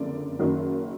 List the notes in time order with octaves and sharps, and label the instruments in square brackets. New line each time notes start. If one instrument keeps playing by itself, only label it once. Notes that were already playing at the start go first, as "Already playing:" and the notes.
Already playing: [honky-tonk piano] F#1 F2 D3 D5
F#1 F#2 D#3 F#3